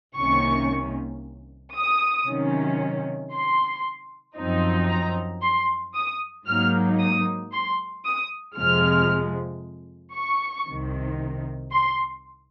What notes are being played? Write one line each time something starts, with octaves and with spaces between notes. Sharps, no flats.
C2 C3 D#3 A#3 C#4 C#6
D#6
C3 D#3 F#3 C#4
C6
F#2 F3 C4 D#4
A#5
C6
D#6
G#2 F#3 A#3 D#4 F6
D#6
C6
D#6
F2 C3 F3 G#3 F6
C#6
C2 C3 D#3
C6